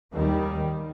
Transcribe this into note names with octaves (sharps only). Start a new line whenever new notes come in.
D#2 D#3 G3